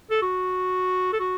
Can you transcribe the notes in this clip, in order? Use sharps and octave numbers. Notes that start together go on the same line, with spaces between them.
A4
F#4
A4
F#4